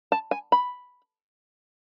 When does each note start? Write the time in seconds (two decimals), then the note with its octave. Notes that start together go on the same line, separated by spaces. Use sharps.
0.12 A5
0.31 G#5
0.52 B5